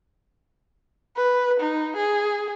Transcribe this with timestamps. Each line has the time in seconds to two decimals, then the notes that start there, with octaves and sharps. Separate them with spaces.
1.17 B4
1.60 D#4
1.96 G#4